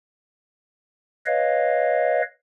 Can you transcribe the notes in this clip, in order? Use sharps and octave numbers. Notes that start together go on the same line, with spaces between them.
B4 C#5 D#5 F5